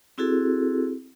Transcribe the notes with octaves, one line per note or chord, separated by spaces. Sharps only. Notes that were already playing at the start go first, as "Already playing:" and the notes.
C4 E4 F#4 G#4 A4